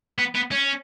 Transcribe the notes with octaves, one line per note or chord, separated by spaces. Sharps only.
B3
B3
C#4